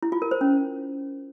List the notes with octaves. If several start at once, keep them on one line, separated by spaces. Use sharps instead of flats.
E4
F4
A#4
C5
C#4